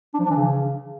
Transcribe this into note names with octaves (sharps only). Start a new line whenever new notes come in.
D4
F3
D4
E3
C#3